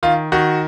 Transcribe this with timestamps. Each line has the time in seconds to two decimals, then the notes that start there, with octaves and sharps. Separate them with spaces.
0.03 D#3 F4
0.32 D#3 F#4